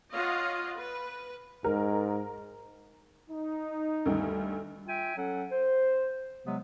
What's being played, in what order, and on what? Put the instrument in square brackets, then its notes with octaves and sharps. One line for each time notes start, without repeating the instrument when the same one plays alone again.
[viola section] F4 C#5 D#5 F5 F#5
B4
[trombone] G#2 [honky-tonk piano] A#4
[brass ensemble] D#4
[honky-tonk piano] D2 G2 D#3
[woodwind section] F4 E5 G5 G#5
F#3 C#4 A4 F#5
C5
C3 F#3 G#3 B3